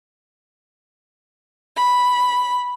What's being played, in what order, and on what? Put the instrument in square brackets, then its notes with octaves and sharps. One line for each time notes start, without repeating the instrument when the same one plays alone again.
[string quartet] B5